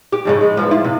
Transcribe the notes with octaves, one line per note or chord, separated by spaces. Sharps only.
G4
F2 G#2 C#3
G#3
E2 G#2 F3
E4 F4
C3